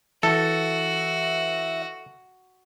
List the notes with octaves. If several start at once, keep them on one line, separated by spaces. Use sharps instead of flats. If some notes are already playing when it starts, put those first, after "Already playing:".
E3 F#4 A4 E5